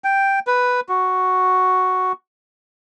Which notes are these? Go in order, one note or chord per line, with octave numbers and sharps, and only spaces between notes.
G5
B4
F#4